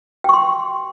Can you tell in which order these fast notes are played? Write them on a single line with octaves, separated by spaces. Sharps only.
G5 C#6 C6